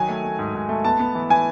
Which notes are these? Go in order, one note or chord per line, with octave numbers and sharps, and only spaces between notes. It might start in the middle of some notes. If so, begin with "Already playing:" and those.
Already playing: D#3 F#3 G#5
A3
A3
G#2
G#2
A3
B3 A5
B3
E3
E3 G#5